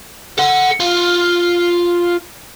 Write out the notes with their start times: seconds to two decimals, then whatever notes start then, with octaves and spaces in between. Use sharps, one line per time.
0.38 A4 F#5
0.80 F4